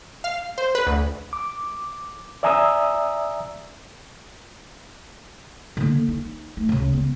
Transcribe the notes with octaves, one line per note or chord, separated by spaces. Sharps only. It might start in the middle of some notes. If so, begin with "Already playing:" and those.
F5
C5
B4
D2
D6
D5 E5 G#5 A#5 D#6 E6
D3 A#3
D#4
A3
C#2 C#3
B3